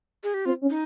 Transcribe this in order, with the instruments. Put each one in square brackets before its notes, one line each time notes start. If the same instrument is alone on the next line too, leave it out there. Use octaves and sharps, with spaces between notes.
[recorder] G#4
G4
[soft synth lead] C4 [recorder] F4
[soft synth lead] C#4
[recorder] D#4